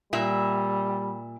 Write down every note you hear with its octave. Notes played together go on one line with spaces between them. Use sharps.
A#2 G3 E5